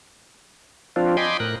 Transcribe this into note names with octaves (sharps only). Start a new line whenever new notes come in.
F3 C4 D4 F4
D#5 G5 G#5 B5 C6 D6
A2 A#4 F#6